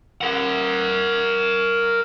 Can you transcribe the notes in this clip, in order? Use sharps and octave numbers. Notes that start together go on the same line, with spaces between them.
A#4 F#5